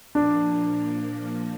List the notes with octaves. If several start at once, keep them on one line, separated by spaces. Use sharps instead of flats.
A#2 F3 A#3 D4